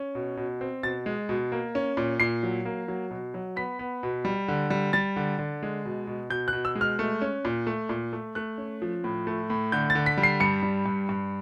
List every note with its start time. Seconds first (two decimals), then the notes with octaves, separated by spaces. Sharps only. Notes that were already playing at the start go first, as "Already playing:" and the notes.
Already playing: C#4
0.15 B2
0.37 B2
0.61 C4
0.83 B2 A6
1.06 G#3
1.29 B2
1.52 A#3
1.75 C#4
1.97 A#2
2.20 A#2 C7
2.43 F#3
2.65 A#3
2.88 F#3
3.11 B2
3.34 F#3
3.56 B3 B6
3.79 B3
4.03 B2
4.25 G3
4.48 D3
4.70 G3
4.93 G3 A6
5.16 D3
5.39 D3
5.63 G#3
5.85 B2
6.07 B2
6.30 B2 G6
6.48 F#6
6.53 B2
6.65 E6
6.75 G#3
6.81 F6
6.99 A3
7.22 C#4
7.45 A#2
7.67 A3
7.89 A#2
8.13 A3
8.35 A3 F#6
8.58 C#4
8.82 F3
9.04 A2
9.27 A3
9.50 A2
9.72 D3 G6
9.90 A6
9.95 D3
10.06 B6
10.17 G3
10.23 C7
10.40 G2 C#7
10.63 G3
10.86 G2
11.09 G2